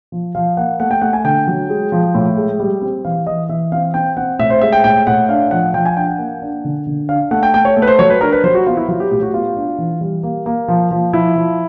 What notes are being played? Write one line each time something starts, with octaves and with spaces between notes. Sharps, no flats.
F3
F3 F5
A#3 F#5
A3 F#5
G5
A3 F#5
G#5
D3 G5
F#3
G#3
F3
A2
G#3
G3
C4
E3 F5
E3 D#5
E3 E5
C4 F5
C4 G5
C4 F#5
A2 E5
C5
G#3 E5
G5
A2 G5
A2 F#5
D4 F5
F3 F#5
F3 G5
G#5
D4 G5
F#5
A#3
D4
D3
D3
D4 F5
A3 F#5
G5
A3 G5
C#5
A3
B4
C5
F#3 C#5
B4
D4 A#4
B4
F#3 C5
F#4
B3 F4
E4
F#3 F4
G4
A2 G4
F#4
B3 F4
D4
E3
G3
A#3
A#3
F3
F3
F3 E4
F3